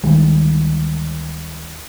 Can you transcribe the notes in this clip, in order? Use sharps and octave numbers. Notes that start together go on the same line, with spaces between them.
D2 D#3 G3 G#3